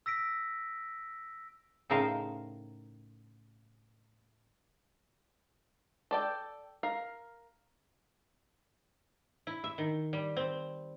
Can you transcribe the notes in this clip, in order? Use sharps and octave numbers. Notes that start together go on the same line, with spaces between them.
E6 A#6 B6 D7
A2 C#3 D#4 A#4 C5 F5
A4 D5 G5
A#4 F5
E4
E5
D#3
G3
C4